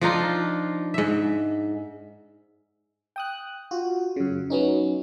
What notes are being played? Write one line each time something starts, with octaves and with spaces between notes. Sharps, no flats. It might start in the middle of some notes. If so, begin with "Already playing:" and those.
F3 D4 D#4 F4
G#2 E5
G5 D#6 F#6
F4 F#4
F#2 C#3
F#3 B3 C#4 D#4